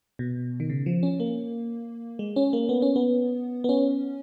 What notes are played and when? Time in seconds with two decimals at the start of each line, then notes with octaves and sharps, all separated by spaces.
0.19 B2
0.60 D#3
0.70 C#3
0.86 F3
1.03 C#4
1.20 A#3
2.19 G#3
2.36 C#4
2.53 A#3
2.69 B3
2.82 C#4
2.96 B3
3.64 B3
3.69 C#4